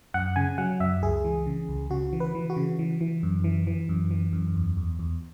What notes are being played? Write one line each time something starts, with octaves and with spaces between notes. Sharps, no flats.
F#2 F#5
C#3 G#5
F#3 F#5
F#2 E5
C#2 G#4
E3
C#3
C#2
C#3 F#4
E3
B4
E3
F#4
C#3
E3
E3
F#2
E3
E3
F#2
E3
F#2
E2
E2
E2